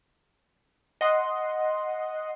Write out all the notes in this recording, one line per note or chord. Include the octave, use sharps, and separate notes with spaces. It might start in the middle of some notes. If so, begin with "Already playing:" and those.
D#5 F#5 C6